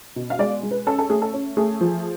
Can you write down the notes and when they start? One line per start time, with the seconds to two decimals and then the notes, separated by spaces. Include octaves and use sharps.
0.16 B2
0.30 F5
0.39 G#3 D5
0.63 G#3
0.71 B4
0.87 C#4 A4
0.98 A4
1.09 A3 G#4
1.22 A4
1.34 C#4
1.57 A3 G#4
1.81 F3